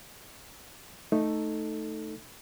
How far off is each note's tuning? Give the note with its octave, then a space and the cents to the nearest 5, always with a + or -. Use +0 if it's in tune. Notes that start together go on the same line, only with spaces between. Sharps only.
A3 +0 D#4 +0 A4 +5